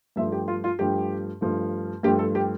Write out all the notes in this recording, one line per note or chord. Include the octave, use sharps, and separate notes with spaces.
G2 F3 A3 E5
G4
F4
F4
G2 F3 A3 G4
G2 F3 A3
G2 F3 A3 G4
A4
G4